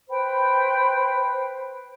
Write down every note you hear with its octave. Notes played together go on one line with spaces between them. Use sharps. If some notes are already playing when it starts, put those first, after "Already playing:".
B4 C5 G5 B5